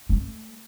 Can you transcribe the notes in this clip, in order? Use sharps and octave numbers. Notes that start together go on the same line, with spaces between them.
A3